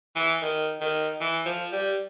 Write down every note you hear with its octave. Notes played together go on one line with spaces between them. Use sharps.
E3
D#3
D#3
E3
F3
G3